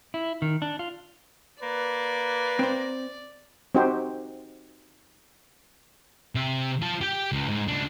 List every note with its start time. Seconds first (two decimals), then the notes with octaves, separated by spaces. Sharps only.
0.14 E4
0.42 D#3
0.62 D4
0.79 F4
1.63 A#3 B4 D5
2.59 C4 C5
3.75 C4 D#4 F#4 G4 C5
6.35 C3 E5
6.82 F4 A5
7.01 G4 G5
7.32 C#2
7.48 G#2
7.68 C#2 D4